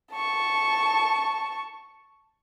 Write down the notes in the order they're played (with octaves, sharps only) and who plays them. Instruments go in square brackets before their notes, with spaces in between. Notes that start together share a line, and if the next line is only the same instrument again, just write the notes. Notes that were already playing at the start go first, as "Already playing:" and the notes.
[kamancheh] A5 C#6